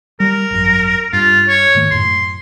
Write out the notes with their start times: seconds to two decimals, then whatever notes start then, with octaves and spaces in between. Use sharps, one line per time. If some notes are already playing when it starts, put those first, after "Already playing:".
0.20 G3 A#4
0.51 G#1 F#2
1.13 G2 F4
1.48 C#5
1.75 G#2 D#3 A3
1.91 F#2 A2 C6